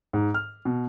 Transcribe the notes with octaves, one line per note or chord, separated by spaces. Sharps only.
G#2
F6
B2